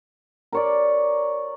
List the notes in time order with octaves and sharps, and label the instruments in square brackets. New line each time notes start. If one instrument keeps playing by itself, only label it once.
[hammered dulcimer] A#4 C#5 D5